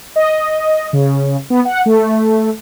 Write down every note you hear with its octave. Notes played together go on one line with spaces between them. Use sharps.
D#5
C#3
B3
F#5
A3